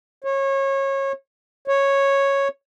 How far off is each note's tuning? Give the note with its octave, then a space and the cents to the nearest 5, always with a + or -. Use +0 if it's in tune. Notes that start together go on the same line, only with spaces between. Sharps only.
C#5 -25
C#5 -5